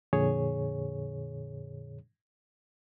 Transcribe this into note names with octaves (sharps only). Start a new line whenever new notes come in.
F2 A#2 D3 G#4 C#5